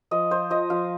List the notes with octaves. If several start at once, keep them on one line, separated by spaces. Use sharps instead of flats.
F3 D#5
F4 C5
F3 D#5
F3 F5